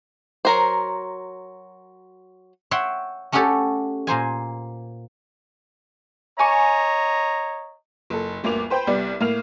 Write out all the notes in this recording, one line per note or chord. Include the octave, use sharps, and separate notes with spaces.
F#3 A#4 C5
C#5 E5 F#5 G5 C6
A3 C#4 F#4 G4 A4 C#5
A#2 A#3 C5 G#5
C#5 D#5 G#5 A#5 C#6
F#1 A4
G1 D2 A#3 D6 F7
B4 C5 G5 B5 G6
C2 G3 B3 D5
A2 A#3 F6 C7 F7